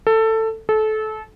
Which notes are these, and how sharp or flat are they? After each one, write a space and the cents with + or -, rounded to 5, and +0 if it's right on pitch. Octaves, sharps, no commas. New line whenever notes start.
A4 +15
A4 -25